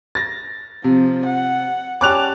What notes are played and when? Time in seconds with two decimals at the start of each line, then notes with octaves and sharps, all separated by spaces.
0.15 A6 A#6
0.84 C3 F3
1.26 F#5
2.01 G3 C#4 A5 D6 F#6 F7